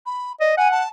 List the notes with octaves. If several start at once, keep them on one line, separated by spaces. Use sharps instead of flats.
B5
D5 D#5
F#5 G#5
A5